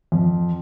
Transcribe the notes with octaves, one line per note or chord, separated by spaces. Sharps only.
F2